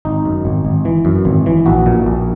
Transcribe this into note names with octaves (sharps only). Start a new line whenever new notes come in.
G#1 D#4
F#2
G#1
G#1
E3
F#2
G#1
E3
A#1 F#4
A#2
A#1